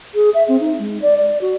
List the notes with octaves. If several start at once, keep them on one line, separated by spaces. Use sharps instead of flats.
G#4
E5
C4
D#4
G#3
D5
D5
F#4